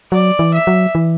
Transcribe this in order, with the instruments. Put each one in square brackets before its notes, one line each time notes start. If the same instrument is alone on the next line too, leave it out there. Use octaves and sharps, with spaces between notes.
[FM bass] F#3 [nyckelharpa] D5
[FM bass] E3
[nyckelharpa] E5
[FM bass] F#3
E3